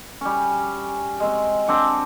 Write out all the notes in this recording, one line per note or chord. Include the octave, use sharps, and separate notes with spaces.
G3 C#4
G#3 C4
C4 D4 C5 F#5